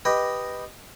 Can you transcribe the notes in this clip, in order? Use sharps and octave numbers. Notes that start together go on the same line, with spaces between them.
G4 B4 D#5